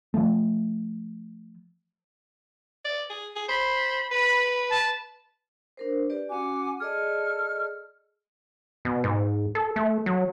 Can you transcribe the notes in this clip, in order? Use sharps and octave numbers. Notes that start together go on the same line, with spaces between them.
F3 A3
D5
G#4
G#4
C5 B5
B4 B5
A5
D4 A#4 C5
G4 B4 D5
C#4 F#4 F#5 G#5 D6
G#4 A4 D5 D#5 F6
B2
G#2
A4
A3
F#3